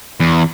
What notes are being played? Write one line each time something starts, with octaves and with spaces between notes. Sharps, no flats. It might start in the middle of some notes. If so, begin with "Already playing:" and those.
E2